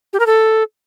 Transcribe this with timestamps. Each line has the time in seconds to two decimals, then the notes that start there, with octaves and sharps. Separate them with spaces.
0.13 G4
0.20 A#4
0.26 A4